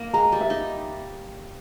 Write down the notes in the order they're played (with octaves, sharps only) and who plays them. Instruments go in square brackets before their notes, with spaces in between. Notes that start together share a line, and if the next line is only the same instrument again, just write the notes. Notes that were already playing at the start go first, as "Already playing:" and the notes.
Already playing: [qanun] A#3
[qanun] G#3 [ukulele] A#5
[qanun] G3
[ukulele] E5
[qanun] D#4